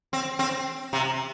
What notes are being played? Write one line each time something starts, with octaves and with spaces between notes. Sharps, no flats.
C4
C4
C3